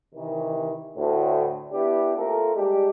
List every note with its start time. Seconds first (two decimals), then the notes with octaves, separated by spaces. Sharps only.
0.14 C3 D#3 E3
0.97 D2 A2
1.72 B3 D4 E4 G4
2.16 A3 A#3 C4 F4 A4 A#4
2.55 G3 G#3 D4 G4